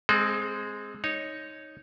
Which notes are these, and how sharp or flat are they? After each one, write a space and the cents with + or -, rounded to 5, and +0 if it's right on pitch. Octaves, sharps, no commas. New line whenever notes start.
G#3 +0 C4 +0 A4 -45
D#4 +0 C#5 +0